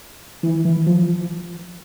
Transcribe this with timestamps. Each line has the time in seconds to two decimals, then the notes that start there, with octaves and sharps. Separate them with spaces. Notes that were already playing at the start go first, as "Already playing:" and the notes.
0.43 E3
0.65 E3
0.87 F3